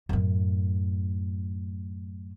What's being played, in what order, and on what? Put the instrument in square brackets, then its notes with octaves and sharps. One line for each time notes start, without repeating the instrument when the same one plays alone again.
[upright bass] F#2 A2